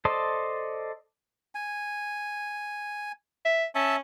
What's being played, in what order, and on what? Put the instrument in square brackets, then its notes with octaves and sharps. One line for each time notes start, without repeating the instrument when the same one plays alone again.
[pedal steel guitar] A4 C5 D5 D#5 A5
[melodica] G#5
[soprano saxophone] E5
[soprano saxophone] C#4 [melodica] E5 A5